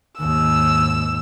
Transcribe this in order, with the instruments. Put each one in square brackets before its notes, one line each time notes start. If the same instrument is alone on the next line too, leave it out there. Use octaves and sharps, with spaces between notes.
[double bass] D#2 G#2 [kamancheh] E6